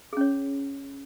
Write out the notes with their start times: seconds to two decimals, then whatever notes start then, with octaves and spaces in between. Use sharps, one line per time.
0.13 G#4
0.17 C#4
0.21 C#5